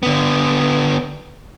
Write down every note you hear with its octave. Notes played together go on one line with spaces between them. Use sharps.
D3 B3